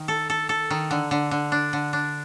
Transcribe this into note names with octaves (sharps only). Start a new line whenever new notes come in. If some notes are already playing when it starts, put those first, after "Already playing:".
Already playing: D#3
A4
A4
A4
D#3
D3
D3
D3
D4
D3
D4